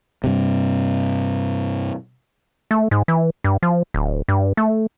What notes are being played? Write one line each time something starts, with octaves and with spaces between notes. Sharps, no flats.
G2 C3
A3
G#2
E3
G2
F3
D1
G2
A3